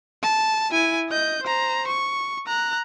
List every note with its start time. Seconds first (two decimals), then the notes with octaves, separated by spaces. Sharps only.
0.23 A5
0.71 E4 G#5
1.09 D#5 G6
1.43 C5 A#5
1.88 C#6
2.47 A#5 F#6